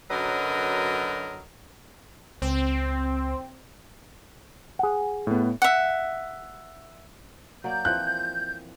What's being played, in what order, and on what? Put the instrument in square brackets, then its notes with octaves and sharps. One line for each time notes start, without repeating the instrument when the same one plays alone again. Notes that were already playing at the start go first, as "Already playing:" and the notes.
[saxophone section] F#2 D3 F#3 A#4 B4 D#5
[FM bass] C#2 [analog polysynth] C4
[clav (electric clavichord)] G#4 F#5
[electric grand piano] A2 B3
[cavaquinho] E5 F#5
[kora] F#3 A#3 D5 [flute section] G6
[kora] E3 F3 C4 [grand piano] F#6